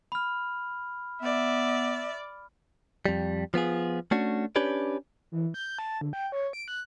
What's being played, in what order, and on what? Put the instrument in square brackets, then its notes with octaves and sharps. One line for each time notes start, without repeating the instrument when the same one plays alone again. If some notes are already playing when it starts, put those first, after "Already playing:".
[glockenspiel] B5 F6
[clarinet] B3 [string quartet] D5 [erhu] E5
[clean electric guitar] F2 G3
F3 B3 F4 G#4
A3 C#4 D4 F#4
C#4 D4 G4 B4 C#5 D5
[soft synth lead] E3
G6
A5
D3
G5
C#5
D7
F#6